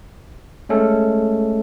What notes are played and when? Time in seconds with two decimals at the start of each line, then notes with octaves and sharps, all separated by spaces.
0.69 G#3 A3 C#4 A4